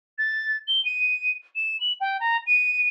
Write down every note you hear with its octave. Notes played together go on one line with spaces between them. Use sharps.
A6
G7
D#7
E7
F#7
G5
A#5
D#7